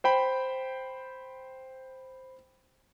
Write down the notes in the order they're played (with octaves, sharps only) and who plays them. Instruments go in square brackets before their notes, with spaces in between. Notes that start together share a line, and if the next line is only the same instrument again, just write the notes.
[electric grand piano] C5 G5 B5